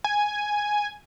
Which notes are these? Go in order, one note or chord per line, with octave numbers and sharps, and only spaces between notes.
G#5